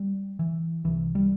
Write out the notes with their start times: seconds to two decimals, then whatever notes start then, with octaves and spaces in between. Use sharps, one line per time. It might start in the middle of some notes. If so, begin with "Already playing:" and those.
Already playing: G3
0.39 E3
0.84 C2 C3 E3
1.15 G3